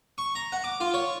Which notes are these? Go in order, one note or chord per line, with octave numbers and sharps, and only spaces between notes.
C#6
A#5
F#5
D6
F4
C#5